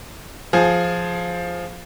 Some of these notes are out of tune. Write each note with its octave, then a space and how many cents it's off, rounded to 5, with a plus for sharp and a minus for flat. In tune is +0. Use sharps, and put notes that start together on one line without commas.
F3 +0 G#4 +10